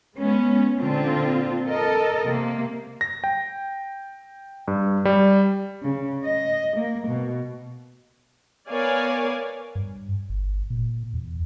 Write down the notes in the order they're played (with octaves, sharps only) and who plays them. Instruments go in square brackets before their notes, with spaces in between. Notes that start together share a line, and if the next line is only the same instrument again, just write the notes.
[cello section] G#3 B3 C#4
A#2 D3 C4 F4
A4 A#4 D#5
C3 A#3
[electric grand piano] A#6
G5
G2
G3
[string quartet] C#3
D#5
A#3
B2
[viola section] B3 A#4 C#5 D5 F5 G#5
[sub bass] G2
G1
A#2
E2